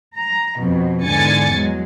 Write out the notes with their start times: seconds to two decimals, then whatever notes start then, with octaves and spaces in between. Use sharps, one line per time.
0.16 A#5
0.59 F2 B2
1.05 E2 G#2 D3 G#5 A6 C#7
1.54 F#3 G#3